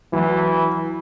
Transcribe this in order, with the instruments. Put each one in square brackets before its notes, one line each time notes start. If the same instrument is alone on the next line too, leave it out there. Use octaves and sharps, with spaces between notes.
[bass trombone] E3 [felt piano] F#3